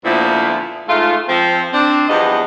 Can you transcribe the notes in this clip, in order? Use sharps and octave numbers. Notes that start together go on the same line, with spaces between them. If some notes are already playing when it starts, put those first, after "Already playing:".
D2 A#2 F3 B3 E4 C5
G#2 A3 F4
F3 C4
C4 D4
E2 G2 F3 B3 D#5